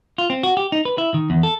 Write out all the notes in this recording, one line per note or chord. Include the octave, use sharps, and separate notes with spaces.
F4
C4
F#4
G4
D#4
B4
E4
D#3
E2
A4